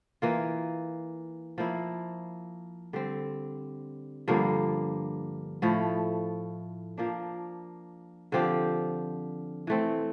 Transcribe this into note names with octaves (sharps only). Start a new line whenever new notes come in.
E3 A#3 F4
F3 A#3 E4
D3 G3 C4
G2 D3 F3 A#3
A2 F3 A3 E4
F3 A#3 D4
D3 F3 C4 G4
E3 A3 C4